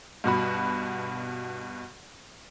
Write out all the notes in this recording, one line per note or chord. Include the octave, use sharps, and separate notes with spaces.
G2 B2 F#4 B5